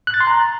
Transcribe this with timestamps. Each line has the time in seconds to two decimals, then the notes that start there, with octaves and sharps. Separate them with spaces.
0.07 F#6
0.14 A6
0.20 C6
0.27 A#5